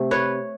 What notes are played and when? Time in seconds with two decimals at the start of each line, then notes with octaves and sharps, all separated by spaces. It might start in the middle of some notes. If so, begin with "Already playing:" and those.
Already playing: C3 A3
0.11 B4 C#5